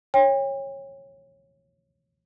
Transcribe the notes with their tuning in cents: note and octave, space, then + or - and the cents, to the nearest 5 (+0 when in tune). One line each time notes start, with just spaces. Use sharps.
C#5 -15 G5 +40